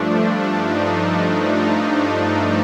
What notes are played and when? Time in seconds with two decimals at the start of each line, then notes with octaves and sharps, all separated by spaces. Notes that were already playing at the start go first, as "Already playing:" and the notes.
Already playing: G2 F3 A3 D4
0.64 D#4
1.54 D#4
2.00 D#4